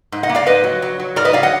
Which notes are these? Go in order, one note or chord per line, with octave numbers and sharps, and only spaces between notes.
G#2
D#5 F#5
A#3
D5 F5
G#2 B4 D#5
F#3
F#3
F#3
G#2 A#4 D5
B4 D#5
F#3 D5 F5
D#5 F#5